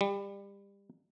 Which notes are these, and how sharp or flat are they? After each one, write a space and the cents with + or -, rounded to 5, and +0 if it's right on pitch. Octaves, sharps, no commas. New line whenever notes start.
G3 +25